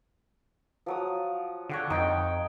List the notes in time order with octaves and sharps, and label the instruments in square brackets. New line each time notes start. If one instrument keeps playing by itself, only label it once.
[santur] F3 F#3 D#6
[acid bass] D3 [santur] C#5 F#5 G5
[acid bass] F2 [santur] D#4 G5